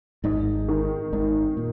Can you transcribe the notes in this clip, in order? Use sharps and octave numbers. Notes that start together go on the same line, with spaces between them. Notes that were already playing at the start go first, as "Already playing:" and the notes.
G#1 G#2 D#4
D#3
G#1 G#2 D#4
A#2